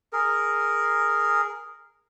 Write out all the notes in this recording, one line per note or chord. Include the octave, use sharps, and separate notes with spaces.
G#4 A#4